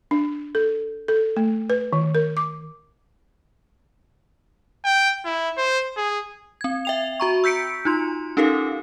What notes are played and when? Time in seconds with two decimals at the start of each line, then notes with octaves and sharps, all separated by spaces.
0.11 D4
0.55 A4
1.08 A4
1.37 A3
1.70 B4
1.93 D#3
2.15 A#4
2.37 D6
4.85 G5
5.25 E4
5.58 C5
5.96 G#4
6.61 C4 G#6
6.85 E5 G5 F7
7.20 F#4 A#5 C#6
7.44 E6 G6 B6 C#7 D7
7.85 D#4 F4 C6
8.37 C#4 D#4 G4 A4 A#4 F5